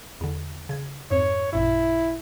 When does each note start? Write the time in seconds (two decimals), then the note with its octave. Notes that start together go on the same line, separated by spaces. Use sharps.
0.21 E2 D3
0.69 C#3 G#6
1.11 F2 G#2 C#5
1.53 A1 F#2 A#2 E4